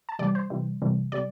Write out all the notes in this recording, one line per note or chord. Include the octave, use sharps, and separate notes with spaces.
A5
C3 E3 G3 D5
C5
C3 E3 G3
C3 E3 G3
C3 G3 D5